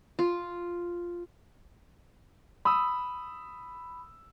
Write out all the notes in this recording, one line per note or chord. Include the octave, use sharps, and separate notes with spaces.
F4
B5 D#6 E6